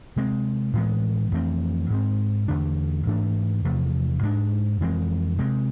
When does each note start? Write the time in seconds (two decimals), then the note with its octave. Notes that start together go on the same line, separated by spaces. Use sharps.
0.16 C3 G#3 C4
0.73 A2 E3 G#3 B3
1.31 F2 E3 A3 C4
1.90 G#2 G#3 C4
2.48 E2 D3 A3 D4
3.06 G#2 E3 A3 D4
3.64 E2 C3 F3 A3
4.23 G#2 G#3 D4
4.81 F2 E3 G#3 C4
5.38 C3 G#3 C4